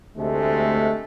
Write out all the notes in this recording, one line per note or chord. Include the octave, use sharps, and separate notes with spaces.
D2 C3 G#3 A3